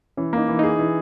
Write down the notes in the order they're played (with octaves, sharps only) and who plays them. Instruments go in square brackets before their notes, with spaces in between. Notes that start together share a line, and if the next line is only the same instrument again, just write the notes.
[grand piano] E3 [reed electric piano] C#4
[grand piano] A#3
[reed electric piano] D#4
[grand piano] E3
[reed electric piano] D#4 [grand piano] G#4
[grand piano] E3